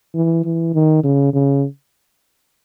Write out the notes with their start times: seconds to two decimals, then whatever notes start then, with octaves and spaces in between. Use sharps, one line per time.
0.15 E3
0.45 E3
0.74 D#3
1.04 C#3
1.34 C#3